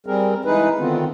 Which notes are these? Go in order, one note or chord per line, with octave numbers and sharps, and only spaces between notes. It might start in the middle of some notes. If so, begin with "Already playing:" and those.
G3 C4 G#4 A#4
E3 G#3 D#4 G#4 B4
D3 D#3 B3 C4 F4